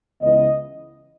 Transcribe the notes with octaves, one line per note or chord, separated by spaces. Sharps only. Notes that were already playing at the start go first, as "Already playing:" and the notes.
C#2 C#3 E3 B3 D#5